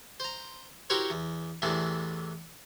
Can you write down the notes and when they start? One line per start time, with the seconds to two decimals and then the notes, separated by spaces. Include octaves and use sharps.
0.20 C5 A#5
0.90 E4 F#4 G4 A#4 C5 C#5
1.10 E2
1.62 E2 A2 C3 E3 D4